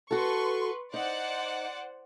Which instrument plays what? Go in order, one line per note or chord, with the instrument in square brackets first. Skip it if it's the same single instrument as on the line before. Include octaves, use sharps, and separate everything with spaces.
[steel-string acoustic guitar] F#4 A4 [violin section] B4 C6 C#6
[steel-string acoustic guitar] D#4 [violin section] C5 D5 F#5